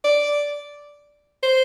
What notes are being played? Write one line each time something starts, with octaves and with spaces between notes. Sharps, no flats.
D5
C5